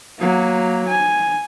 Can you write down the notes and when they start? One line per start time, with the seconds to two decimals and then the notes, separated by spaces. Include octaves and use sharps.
0.19 F#3 A#3
0.88 G#5